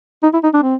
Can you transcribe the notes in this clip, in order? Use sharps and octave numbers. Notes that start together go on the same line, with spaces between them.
D#4
E4
D#4
D4
C4